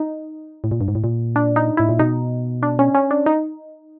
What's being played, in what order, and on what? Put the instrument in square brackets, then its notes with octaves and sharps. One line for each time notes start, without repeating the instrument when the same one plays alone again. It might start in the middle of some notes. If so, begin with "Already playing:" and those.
Already playing: [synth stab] D#4
[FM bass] A2
A#2
G2
G#2
A2
A#2
[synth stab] D4
D#4
[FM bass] A2 [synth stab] E4
[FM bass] A#2
[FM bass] B2 [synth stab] D#4
[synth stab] D4
C#4
C#4
D4
D#4